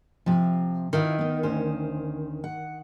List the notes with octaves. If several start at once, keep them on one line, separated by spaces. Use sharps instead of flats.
C3 F3
D#3 E4 F4 B4
B3 D#4
D2 C#4 C5
F#5